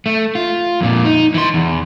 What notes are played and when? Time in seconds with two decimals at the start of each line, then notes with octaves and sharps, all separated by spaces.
0.06 A3
0.35 F4
0.81 F2 A#2
1.05 D#4
1.34 E3 C6
1.54 E2